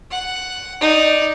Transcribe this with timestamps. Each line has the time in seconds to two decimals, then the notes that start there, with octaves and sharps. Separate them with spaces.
0.11 F#5
0.81 D#4 D5